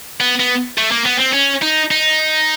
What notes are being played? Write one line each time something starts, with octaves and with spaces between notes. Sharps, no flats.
B3
B3
A3
A#3
B3
C4
C#4
D#4
D#4